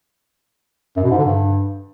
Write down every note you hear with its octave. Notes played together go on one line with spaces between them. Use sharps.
F#2
B2
G#2
D3
G2